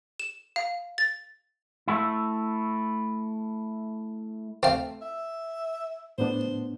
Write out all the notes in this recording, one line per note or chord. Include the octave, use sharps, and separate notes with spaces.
E7
F5
A6
A3 E4
A3 C4 F5
E5
A2 B3 D4 C5